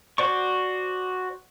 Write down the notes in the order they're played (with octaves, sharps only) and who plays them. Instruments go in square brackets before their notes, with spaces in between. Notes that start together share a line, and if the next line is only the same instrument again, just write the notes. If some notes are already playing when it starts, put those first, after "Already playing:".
[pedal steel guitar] F#4 C5 D5 C#6